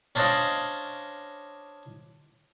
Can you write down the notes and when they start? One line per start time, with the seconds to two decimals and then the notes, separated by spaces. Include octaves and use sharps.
0.15 C#4 D4 C5 D5 D#5 F5